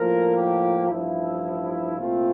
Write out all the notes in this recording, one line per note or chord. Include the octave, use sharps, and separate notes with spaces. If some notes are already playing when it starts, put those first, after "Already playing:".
Already playing: A2 F3 A#3 A#4
G4
A1 G2 F3 E4
C2 A#2 A3 C4 F4